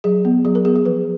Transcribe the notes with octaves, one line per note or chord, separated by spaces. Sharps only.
F#3 G#4
B3
F#3 G#4
A#4
B3 G#4
G#4
F3 B4